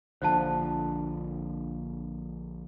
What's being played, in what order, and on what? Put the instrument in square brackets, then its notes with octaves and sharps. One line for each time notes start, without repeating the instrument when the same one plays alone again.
[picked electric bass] A#1 D3 F3 [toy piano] C5 A5